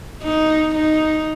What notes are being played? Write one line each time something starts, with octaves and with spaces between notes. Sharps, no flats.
D#4
D#4